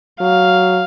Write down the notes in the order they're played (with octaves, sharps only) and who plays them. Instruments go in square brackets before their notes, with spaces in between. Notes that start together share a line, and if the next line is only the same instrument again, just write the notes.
[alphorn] F#3 [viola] F5